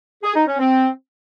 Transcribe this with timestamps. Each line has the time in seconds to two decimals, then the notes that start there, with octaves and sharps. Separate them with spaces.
0.23 G#4
0.35 D#4
0.47 C#4
0.59 C4